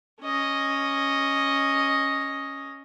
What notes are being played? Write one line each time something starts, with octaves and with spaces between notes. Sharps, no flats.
C#4 D#5